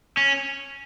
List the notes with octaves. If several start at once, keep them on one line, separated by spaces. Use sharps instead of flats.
C#4